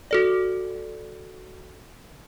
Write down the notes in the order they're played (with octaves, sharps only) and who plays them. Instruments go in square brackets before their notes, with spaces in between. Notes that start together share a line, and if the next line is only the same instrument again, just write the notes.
[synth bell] F#4 A4 D5